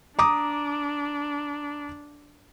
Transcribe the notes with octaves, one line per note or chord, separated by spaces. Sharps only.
D4 A#5 D6 D#6